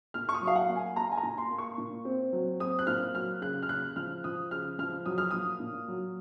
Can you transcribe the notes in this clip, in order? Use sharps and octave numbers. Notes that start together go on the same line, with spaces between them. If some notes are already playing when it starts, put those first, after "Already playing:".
A#2 F6
C#6
D#6
F#3
F5
F#5
A#3
G#5
A#3 A#5
G#5
A#5
A#2
C6
A#3
C#6
A#2
C4
F#3
C4 D#6
F#6
A#2 F6
F#3 F6
C#3 F#6
F6
C#3 F#6
F3 F6
F3 D#6
C#3 F6
F3 F6
F#3 D#6
F6
A#2 D#6
A#2
F#3